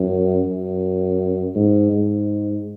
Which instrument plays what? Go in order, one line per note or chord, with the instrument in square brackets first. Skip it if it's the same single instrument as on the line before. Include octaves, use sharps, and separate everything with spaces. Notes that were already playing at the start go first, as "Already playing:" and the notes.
Already playing: [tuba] F#2
F#2
G#2
G#2